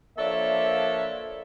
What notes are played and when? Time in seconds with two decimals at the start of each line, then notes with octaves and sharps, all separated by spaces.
0.18 F3 A#3 D4 A4 C#5 E5